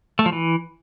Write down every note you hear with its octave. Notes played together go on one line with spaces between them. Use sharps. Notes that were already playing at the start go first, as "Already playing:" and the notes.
A3
F3
E3